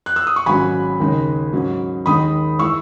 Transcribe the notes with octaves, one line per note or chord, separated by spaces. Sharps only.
F#6
E6
D#6
C#6
G#1 G#2 F#3 C#4 G#5 B5
D#2 C#3 G#3 D#4
G#2 F#3 C#4
D#2 D#3 G#3 D#4 B5 D#6
E3 G#3 C#6 E6